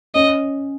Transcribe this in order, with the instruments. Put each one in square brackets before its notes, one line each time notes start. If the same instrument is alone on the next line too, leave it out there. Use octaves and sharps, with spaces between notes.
[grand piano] C#4 [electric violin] D#5